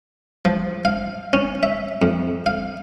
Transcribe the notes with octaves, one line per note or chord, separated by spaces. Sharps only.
F3
F5
C#4
E5
F2
F5